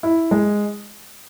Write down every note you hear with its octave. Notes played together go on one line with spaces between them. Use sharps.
E4
G#3